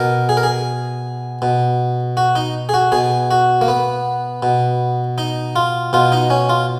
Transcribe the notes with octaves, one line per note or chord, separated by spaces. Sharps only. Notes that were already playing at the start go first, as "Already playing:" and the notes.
Already playing: B2 A#4
G#4
A#4
G#4
B2
F#4
D#4
G#4
F#4
B2 G#4
F#4
A#3
B3
B2
D#4
F4
B2 F4
D#4
C#4
F4